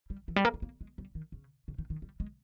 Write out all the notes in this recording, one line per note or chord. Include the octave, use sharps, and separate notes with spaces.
G3
E3
G3
A#3
G#3
A#3
G#3
G3
D#3
C#3
C#3
D#3
D#3
G3
G#3